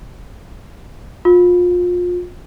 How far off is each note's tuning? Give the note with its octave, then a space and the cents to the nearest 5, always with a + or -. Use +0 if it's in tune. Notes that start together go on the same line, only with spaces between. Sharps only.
F4 +30